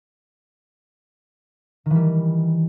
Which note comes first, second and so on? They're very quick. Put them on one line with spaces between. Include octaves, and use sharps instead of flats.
D#3 E3 G3